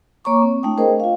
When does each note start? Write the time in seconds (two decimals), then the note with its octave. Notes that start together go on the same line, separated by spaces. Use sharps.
0.24 A#3 C#5 A#5 C#6 D6
0.42 C4
0.63 A3 D4 E4 G5 D#6
0.77 G#4 A#4 C5 D#5 G5
1.00 F4 F5